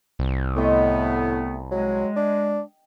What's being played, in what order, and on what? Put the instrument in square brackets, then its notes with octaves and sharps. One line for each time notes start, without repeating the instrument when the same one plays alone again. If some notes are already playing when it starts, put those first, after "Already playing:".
[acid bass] C2
[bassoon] A2 [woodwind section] A3 B3 [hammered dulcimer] D#5 G5
[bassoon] F#3 [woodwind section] G#3
[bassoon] D4